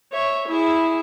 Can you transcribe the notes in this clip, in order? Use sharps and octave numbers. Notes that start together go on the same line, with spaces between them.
C#5 E5
E4 G#4 E5